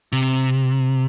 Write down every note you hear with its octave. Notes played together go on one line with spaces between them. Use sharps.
C3